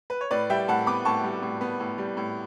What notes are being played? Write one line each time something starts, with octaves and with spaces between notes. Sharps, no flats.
B4
C#5
A2 B4 D5
G3 E5 G5
A2 F#5 A5
B3 B5 D6
A2 A5 C#6
G3
A2
B3
A2
G3
A2